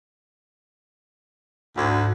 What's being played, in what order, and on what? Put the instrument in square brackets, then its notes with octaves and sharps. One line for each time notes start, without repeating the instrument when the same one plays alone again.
[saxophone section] D2 [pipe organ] G#2